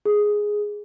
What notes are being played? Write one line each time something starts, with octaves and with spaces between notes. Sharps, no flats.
G#4